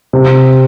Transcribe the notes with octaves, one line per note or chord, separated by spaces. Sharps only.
C3